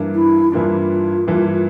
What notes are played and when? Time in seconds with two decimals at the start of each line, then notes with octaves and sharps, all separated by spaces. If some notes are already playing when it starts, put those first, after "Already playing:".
Already playing: G2 E3 A#3 D4
0.15 E4
0.52 G2 E3 A#3 D4 F4
1.27 G2 E3 A#3 D4